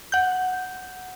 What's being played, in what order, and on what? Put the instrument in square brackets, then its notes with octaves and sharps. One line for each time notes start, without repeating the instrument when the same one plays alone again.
[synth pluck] F#5 G6